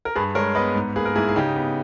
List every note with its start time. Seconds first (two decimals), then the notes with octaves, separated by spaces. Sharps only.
0.05 A#4
0.15 G2 G#4 B4
0.35 G#3 A#4 C#5
0.55 B3 B4 D#5
0.75 G#2
0.96 A#3 G#4 B4
1.05 A#4
1.15 G#2 E4 G#4
1.29 G#4
1.36 C#3 D#4 G4
1.56 B3